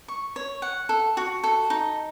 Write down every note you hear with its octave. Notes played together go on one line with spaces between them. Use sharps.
C#6
C#5
F#5
A4
F#4
A4
D#4